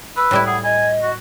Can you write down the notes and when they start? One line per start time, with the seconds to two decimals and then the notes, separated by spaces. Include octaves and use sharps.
0.17 B4 E6
0.31 A2 G3 E4
0.46 G#4 F#5
0.64 D#5 G#5
1.02 F#4